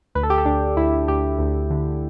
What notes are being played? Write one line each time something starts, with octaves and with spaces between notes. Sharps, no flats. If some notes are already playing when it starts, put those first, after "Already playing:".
D2 B4
A4
G4
A4
D2 D4
D2 E4
D2 G4
D2
D3